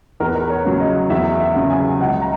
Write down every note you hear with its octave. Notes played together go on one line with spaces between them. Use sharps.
E2 A#4
B4
A#4
C#5
C#3 F#3
D#5
E2 E5
E5
C#3 F#3
G#5
C#2 F#5
A#5